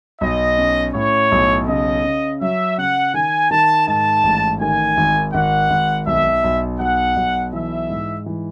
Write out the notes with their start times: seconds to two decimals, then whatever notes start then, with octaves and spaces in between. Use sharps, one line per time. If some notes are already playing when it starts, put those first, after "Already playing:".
0.21 B1 D#5
0.58 C#4
0.95 A2 C#5
1.32 B1
1.68 C#3 D#5
2.04 C#3
2.41 F#3 E5
2.78 C#3 F#5
3.14 D#3 G#5
3.51 D#3 A5
3.87 G#2 A5
4.23 A1
4.60 D#3 G#5
4.97 G#1
5.33 G#1 F#5
5.70 G#1
6.07 B1 E5
6.44 B1
6.80 B1 F#5
7.16 B1
7.53 E3 E5
7.89 G#2
8.26 E3